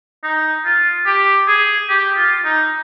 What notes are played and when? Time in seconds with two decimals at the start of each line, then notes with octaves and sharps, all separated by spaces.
0.24 D#4
0.65 F4
1.06 G4
1.48 G#4
1.90 G4
2.17 F4
2.45 D#4